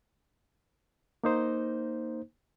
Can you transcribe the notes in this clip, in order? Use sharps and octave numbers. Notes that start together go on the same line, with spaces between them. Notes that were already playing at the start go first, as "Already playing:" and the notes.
A#3 D#4 C5